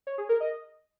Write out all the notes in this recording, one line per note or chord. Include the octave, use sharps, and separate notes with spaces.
C#5
G#4
A#4
D#5